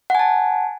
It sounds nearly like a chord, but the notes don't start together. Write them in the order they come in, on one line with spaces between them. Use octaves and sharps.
F#5 G#5 A5